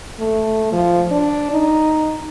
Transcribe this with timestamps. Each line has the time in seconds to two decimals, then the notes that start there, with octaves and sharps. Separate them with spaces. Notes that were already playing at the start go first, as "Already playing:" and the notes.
0.19 A3
0.72 F3
1.11 D4
1.51 D#4